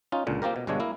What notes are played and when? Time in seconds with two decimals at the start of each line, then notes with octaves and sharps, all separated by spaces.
0.12 C#4 D#4 F4
0.27 C#2 A#2 D3
0.42 A#3 C4 F4 G4 A#4
0.56 B2
0.67 G1 G2 B2 G#3 D4 C#5
0.80 A#3 E4 A#4